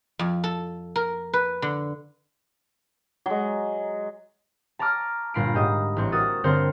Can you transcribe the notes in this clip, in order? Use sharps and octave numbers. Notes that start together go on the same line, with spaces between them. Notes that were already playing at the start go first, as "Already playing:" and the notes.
F2
A4
A#4
B4
D3
F#3 G#3
A5 A#5 C#6 D6 F6
G1 A#2 A#5 B5 C7 D7
G#2 G4 D#5
A1 C4 C#6
F#4 A#4 D#6 E6 A6
G2 D3 C4 A#4 C5 C#7